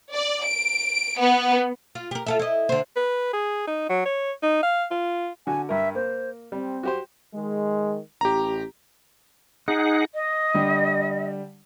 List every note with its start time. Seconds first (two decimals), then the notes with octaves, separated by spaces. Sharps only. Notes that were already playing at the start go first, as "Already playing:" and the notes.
0.14 D5
0.45 D7
1.18 B3
1.95 F4
2.11 G4 A#4
2.26 F4 A4 E5
2.39 E4 D#5
2.69 D3 C5
2.96 B4
3.33 G#4
3.67 D#4
3.89 F#3
4.06 C#5
4.43 D#4
4.63 F5
4.91 F4
5.47 D3 F#4 G#5
5.69 G2 A#4 E5
5.95 A#3 C5
6.52 G3 C4
6.83 F#4 G4 C5
7.34 D#3 G#3
8.21 A1 G4 A#5
9.68 D#4 G#4 F#5
10.14 D#5
10.54 D3 G3 G4